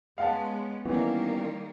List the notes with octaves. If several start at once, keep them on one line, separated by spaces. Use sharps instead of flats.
G#3 B3 C#4 F5 F#5 A5
D#3 E3 G3 A#3 B3 C#4